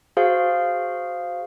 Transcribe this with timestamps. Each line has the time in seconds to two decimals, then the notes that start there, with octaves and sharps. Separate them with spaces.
0.17 F#4 G#4 C5 F5